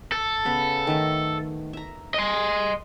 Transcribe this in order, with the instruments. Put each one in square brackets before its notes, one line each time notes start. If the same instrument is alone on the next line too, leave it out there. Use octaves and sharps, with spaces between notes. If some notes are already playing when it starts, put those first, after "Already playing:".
[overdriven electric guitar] A4
[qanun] C#3 B3 B5
D#3 A3 E5
E5 A#5
[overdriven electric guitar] D#5 C6